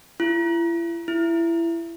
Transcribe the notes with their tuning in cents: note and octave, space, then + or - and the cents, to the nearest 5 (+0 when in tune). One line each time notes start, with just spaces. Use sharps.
E4 +40
E4 +20